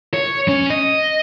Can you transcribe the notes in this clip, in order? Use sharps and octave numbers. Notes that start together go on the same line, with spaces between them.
C#5
C#4
D#5